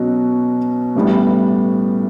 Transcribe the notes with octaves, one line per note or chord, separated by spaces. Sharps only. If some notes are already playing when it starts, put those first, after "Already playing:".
Already playing: B2 F#3 C#4 F#4
A1 A2 G3 B3